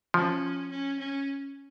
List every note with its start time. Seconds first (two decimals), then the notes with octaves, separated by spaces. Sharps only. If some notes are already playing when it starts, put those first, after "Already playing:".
0.14 F3 C#4
0.71 C#4
0.99 C#4